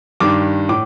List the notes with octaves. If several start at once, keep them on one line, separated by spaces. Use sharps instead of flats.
G2 D#3 D6
A2 D6